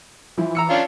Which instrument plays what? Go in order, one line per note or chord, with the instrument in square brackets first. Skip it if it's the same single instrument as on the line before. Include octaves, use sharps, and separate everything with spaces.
[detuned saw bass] E3 [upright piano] F3 E4
[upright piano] A#5 E6 C#7
[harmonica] C#4 D4 F4